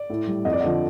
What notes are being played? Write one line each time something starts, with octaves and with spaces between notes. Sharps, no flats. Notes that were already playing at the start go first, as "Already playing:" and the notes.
Already playing: D5
A2
G3
F2 D#5
D5
D3 F3 D#5